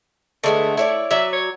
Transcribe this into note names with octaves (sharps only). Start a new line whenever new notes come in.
D3 G#3 A3 B3
E4 C#5 D5
F#3 D5 E5
C#5